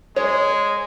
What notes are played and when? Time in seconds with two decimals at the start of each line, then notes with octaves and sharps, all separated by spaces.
0.16 G#3 C#5